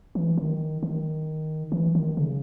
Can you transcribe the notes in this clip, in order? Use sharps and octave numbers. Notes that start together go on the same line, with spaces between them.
E3
D#3
D#3
E3
D#3
C#3